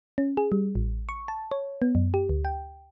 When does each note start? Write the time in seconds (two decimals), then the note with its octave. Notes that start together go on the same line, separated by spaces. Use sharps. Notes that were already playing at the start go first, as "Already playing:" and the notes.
0.18 C#4
0.37 G#4
0.52 G3
0.75 A1
1.09 C#6
1.28 A5
1.51 C#5
1.82 B3
1.95 F#2
2.14 G4
2.29 D2
2.45 G5